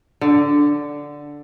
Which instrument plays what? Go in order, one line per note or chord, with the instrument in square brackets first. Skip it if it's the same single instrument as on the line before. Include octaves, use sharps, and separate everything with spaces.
[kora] D3